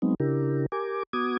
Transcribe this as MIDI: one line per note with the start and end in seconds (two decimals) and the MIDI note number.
0.02 0.14 54
0.02 0.14 56
0.02 0.14 59
0.02 0.14 60
0.02 0.14 63
0.20 0.66 49
0.20 0.66 62
0.20 0.66 64
0.20 0.66 67
0.20 0.66 70
0.72 1.03 67
0.72 1.03 70
0.72 1.03 80
0.72 1.03 86
1.13 1.37 59
1.13 1.37 66
1.13 1.37 86
1.13 1.37 87
1.13 1.37 92